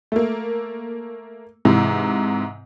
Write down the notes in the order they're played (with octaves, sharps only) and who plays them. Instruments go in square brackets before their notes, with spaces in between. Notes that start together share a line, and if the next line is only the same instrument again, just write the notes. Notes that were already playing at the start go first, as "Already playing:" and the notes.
[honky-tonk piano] A3 A#3
G#2 C3 E3